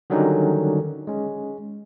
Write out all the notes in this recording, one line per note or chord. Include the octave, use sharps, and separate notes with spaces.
D3 D#3 F#3 G3 C#4 D#4
G#3 C#4